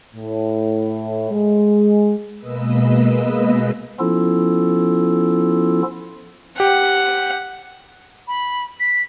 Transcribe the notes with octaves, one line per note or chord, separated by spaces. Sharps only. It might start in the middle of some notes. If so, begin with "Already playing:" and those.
A2
G#3
B2 G#3 A#3 B4 D#5 E6
F3 B3 C#4 E4 F4 A4
G4 F#5
B5
B6